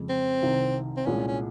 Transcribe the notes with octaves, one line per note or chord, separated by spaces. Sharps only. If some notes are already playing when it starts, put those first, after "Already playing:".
Already playing: F2 C#3 G#3
C4
C2 C3 D#3
C4
C2 A#2 G#3 C#4
C#4